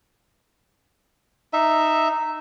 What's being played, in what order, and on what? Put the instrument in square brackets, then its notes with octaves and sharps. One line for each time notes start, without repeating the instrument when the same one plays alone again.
[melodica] D#4 E5